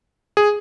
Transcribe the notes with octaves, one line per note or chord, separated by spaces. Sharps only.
G#4